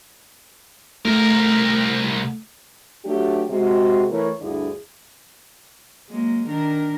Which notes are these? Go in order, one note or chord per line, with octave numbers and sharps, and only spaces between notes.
C2 A3 A#4
F#3 A3 D4 G4
C3 G#3 F#4
E3 A3 E4 A#4 C#5
D2 G2 D3 E4 G#4 D5
F#3 G#3 A#3
D#3 D4 A#4